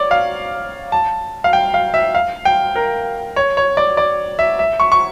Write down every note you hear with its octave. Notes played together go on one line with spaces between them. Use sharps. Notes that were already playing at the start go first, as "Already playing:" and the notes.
Already playing: C#5 D5
F5
A5
F5
G5
F5
E5
F5
G5
A#4
C#5
C#5
D5
D5
E5
E5
C#6
C#6